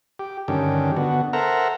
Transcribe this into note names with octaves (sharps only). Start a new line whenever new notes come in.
G4
G2 D3 D#3 C#4 G4
D3 B3 F#4
A4 A#4 C5 E5 F#5 A#5